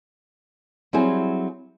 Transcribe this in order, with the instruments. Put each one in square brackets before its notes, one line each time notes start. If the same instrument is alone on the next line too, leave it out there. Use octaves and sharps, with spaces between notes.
[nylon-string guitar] F#3 G3 C4 E4 G#4